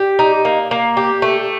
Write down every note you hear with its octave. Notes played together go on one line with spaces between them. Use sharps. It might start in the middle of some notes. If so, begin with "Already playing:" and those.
Already playing: G4
D#4
A#3
A#3
G4
A3